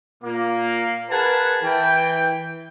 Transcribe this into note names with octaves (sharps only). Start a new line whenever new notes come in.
A#2 A#3
G#4 A#4 B4 F#5 A5
E3 G5